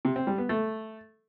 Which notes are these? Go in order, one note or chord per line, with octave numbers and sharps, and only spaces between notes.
C3
C4
G3
B3
A3